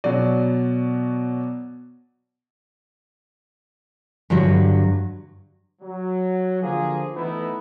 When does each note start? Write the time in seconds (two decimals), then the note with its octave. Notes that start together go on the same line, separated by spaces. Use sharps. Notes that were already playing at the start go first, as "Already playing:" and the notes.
0.04 B2 F#3 D5
4.30 G2 D3 F#3
5.82 F#3
6.62 D3 F3 A#3 G#4
7.16 E3 A3 B3 D#4 E4